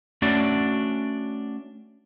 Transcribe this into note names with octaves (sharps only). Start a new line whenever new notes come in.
A3 C#4 D4 F#4 D5